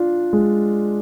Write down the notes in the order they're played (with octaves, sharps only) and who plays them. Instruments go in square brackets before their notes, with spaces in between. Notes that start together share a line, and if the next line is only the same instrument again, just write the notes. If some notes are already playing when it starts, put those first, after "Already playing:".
Already playing: [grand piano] D4 F4
G#3